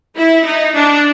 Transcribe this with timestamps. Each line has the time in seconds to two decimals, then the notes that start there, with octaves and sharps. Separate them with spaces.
0.16 E4
0.45 D#4
0.75 D4